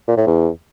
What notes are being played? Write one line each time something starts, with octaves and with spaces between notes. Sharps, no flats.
A#2
A2
E2